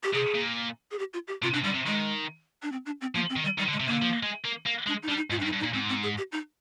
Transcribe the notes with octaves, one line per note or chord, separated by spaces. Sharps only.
G4
C3 G#4
A#2
G#4
G4
F4
G4
C3 F4
C3 D4
D3 G3
C3
D#3 G#3
D4
C4
D4
C4
F3 A#3
C4
D#3
G3
D#3 G3
D3
G#3
C3
D3 A#3
F3
G#3
A#3
A#3
G#3 D4
D#4
G3 D4
D#4
G#2 F4
D4
G2
D#4
G2
D#4
A#2
G#2 C4
C4
G#4
G4
D#4